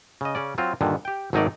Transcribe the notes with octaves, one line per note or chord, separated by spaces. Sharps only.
C#3 D#5
C#3 C#4 D5
F#3 C4 F4
G2 A#2 D3 D#3
G4 G5
G#1 F#3 A3 D#4 A#4 D5